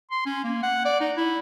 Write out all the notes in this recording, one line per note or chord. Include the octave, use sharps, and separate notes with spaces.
C6
C#4
A#3
F#5
D5
D#4
E4